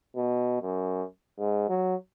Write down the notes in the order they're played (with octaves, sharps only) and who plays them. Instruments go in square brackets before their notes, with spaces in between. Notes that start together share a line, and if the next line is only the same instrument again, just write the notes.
[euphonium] B2
F#2
G#2
F#3